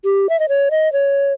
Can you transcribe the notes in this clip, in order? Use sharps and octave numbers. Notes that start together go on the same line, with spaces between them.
G4
E5
D#5
C#5
D#5
C#5